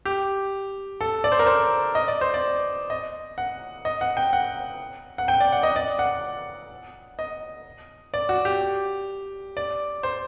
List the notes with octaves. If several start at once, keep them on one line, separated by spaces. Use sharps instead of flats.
G4
A4
D5
C5
A#4
C5
D#5
D5
C5
D5
D#5
F#5
D#5
F#5
G5
F#5
F#5
G5
D5
F#5
D#5
D5
F#5
D#5
D5
F#4
G4
D5
C5